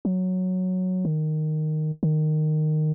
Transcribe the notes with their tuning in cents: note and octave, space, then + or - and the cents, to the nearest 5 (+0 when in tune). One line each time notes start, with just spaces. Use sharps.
F#3 -5
D#3 -10
D#3 -15